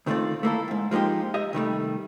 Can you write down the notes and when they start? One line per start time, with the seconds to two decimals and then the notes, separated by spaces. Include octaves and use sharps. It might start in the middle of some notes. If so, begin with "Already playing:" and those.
0.06 D2 D#3 A3 C4 F4 D5
0.43 A3 A#3 E4 A4
0.68 D#2 G#2
0.91 F3 G#3 A#3 D#4 G4
1.34 G4 D#5 E5
1.53 C3 D#3 G3 A3